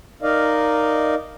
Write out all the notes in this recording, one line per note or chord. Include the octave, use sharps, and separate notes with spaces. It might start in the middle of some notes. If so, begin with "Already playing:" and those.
D#4 A#4 D5 D#5 F5